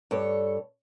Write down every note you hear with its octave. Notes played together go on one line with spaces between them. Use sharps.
G2 A4 C#5